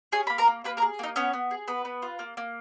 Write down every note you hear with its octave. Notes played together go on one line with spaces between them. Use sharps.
C#4 G#4 G#5
A#3 B5
A#4 A#5
A#3
A#3 B4 B5
A#4 A#5
G#4
A#3 D#4 D#5
B3 C#4 C#5
B3
G#4
B3 B4
B3
F4
A#3
A#3